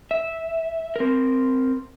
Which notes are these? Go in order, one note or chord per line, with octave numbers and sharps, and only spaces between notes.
E5
C4 A#4